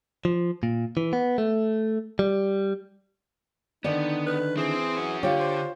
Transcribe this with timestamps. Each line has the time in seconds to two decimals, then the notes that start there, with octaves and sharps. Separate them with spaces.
0.25 F3
0.63 A#2
0.97 E3
1.13 B3
1.38 A3
2.19 G3
3.84 D3 D#3 B3 D#4 D5
4.27 B4
4.57 E3 C4 G#4
4.96 C#4 F#4
5.23 D3 F4 G4 C#5
5.40 C5